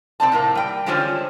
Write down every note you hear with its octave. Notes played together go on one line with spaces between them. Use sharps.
C3 C4 D5 A5
A2 C3 A#3
G3 G5
D3 G3 G#3 C#4 F4 C5